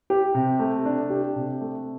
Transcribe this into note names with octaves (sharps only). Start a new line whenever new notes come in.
G4
C3
A3
D4
G4
C3
A3